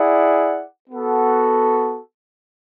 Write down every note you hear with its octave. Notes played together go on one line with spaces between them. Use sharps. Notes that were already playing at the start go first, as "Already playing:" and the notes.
Already playing: E4 G#4 D5 F#5
B3 F#4 A4